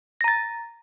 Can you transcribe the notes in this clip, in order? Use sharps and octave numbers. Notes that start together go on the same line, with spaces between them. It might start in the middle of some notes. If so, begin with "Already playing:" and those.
A#5 A6 A#6